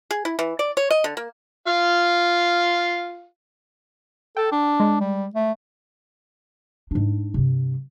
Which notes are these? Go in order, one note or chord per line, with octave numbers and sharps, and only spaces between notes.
G#4
E4
E3
D5
C#5
D#5
D3
A#3
F4 F5
A4 G5
D4
G#3
G3
A3
G#2 D4
G2 C3